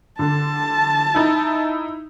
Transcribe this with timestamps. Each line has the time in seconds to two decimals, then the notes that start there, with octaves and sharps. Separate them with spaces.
0.19 D3 A5
1.14 D#4 E4